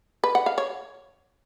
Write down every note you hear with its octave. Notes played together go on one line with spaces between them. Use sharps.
B4
F#5
F5
C#5